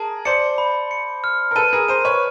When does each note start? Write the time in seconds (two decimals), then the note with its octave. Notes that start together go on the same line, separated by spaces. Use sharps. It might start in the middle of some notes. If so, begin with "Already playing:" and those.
Already playing: G#4 A#4 A5
0.25 C5 D5 C#7
0.58 B5
0.91 C#7
1.24 F6
1.51 A#4
1.56 A4 B4 D#7
1.73 G#4 A#4
1.88 A#4 C5 D#7
2.05 B4 C#5